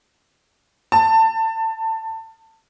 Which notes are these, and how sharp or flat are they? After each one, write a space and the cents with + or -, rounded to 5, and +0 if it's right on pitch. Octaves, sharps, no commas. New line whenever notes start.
A5 +20